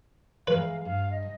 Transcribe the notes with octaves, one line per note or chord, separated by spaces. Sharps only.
E3 G#3 B4 F5 A#5
G2 F5
D#5